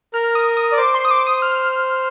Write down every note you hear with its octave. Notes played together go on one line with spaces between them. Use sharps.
A#4 F6
D#6
D#6
D5
C5 D6
C6
D#6
D6
D#6
F6